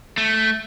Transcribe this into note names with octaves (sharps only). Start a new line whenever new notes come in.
A3